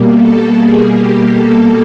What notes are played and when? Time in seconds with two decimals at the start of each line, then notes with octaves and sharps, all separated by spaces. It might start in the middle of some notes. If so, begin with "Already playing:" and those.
Already playing: B2 G3 A#3
0.16 A4
0.54 G#4
0.93 G4
1.31 A4